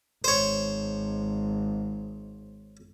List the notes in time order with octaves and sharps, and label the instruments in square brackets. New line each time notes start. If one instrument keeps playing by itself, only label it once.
[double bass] G#1 [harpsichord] C5 C#5